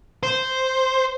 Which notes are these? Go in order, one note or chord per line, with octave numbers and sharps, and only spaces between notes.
C5